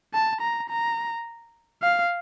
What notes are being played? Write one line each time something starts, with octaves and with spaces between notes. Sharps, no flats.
A5
A#5
A#5
F5